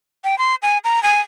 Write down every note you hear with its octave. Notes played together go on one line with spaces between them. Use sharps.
G5
C6
G#5
A#5
G#5